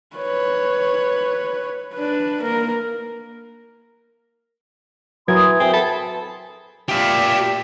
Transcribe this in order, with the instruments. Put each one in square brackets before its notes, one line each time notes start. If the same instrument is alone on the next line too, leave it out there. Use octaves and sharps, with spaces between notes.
[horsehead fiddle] B4 C#5
D4 B4
A#3 A#4
[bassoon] E3 [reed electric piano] F#3 A#4 G#6 [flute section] C6 D#6
[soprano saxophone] C4 [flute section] F#4 E5 [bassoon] G#4
[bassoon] B3 [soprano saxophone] A4 [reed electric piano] B5
[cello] A#2 E5 [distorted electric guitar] G4 F5